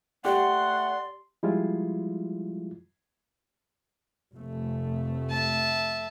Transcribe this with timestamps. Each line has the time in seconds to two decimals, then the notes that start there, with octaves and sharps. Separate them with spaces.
0.25 A3 G4 D5 F#5 C6
1.43 F3 G3 G#3 E4 F4
4.33 F1 A3
5.30 E5 A5